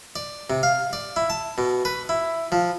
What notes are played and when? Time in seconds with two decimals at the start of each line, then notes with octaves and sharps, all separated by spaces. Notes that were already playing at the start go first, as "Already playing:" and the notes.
0.16 D5
0.50 C3
0.63 F5
0.93 D5
1.16 E4
1.30 A5
1.58 B2
1.85 B4
2.09 E4
2.52 F3